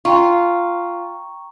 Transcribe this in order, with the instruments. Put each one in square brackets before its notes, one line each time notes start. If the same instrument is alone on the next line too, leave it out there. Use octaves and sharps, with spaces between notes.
[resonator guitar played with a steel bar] F4 [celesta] G5 A#5 C#6